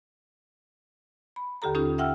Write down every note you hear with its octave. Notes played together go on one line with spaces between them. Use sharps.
B5
D#2 D3 G4 A4 A#5
C#4 D#4 F4 G4 A4
E5 F#5 G5 E6 F6